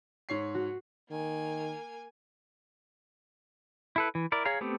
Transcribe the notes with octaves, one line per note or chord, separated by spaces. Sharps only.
G#2 C#5 C7
F#4
D#3 A#3 G#5
E4 A4 B4
E3
E4 A#4 D5
G#4 C#5 F5 A#5
A3 B3 C4 G4